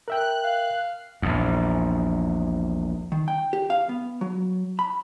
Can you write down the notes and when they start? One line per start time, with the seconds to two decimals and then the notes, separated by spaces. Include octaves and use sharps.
0.08 A#4 E5 G5 F#6
0.44 F5
1.22 A#1 E2
3.12 D#3
3.28 G5
3.53 G4
3.70 F5
3.89 B3
4.21 F#3
4.79 B5